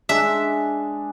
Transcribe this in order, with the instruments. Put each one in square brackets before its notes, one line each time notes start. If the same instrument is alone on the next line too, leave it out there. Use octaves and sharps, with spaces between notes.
[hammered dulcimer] G#3 D4 [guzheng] E5